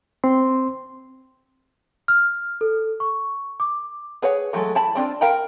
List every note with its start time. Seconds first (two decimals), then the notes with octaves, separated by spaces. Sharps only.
0.24 C4 C6
2.08 F6
2.61 A4
3.00 C#6
3.60 D6
4.22 G#4 B4 C#5 F#5
4.53 E3 F#3 G#3 A3 A4
4.75 E4 A5 B5
4.95 G3 C4 D4 F4
5.21 A#4 F5 G5 A#5 B5